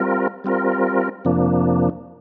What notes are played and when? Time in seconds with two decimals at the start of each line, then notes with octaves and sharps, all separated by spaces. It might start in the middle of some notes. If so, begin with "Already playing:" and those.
Already playing: G3 C4 F4 A#4
0.44 G3 C4 F4 A#4
1.25 F2 C3 F3 A#3 D4